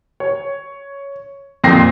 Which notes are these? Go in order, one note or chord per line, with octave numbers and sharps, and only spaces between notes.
C#5
F2 A#2 C4 A#6 C7